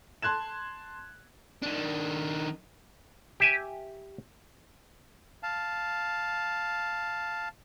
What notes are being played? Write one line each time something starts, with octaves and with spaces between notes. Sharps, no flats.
A5 C6 F#6 G#6 E7
D#3 D4
G4 E5 G#5
F5 A5